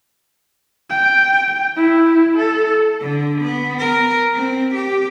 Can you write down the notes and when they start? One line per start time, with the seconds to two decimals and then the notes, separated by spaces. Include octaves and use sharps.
0.90 G5
1.76 E4
2.37 A4
3.01 D3
3.42 B3
3.79 A#4
4.35 C4
4.75 G4